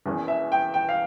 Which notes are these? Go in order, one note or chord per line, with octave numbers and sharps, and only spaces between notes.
E1 E2 E3 A#3 C#4
E5
G5
G5
F5